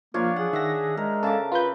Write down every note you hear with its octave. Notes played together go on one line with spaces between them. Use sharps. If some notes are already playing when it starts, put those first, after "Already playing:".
F3 A#3 D4 F4 C#5
G#4 F#5
D#3 E5 F#5 A#6
G#3 A#4
C#3 A4 A5 D6
F4 B4 G6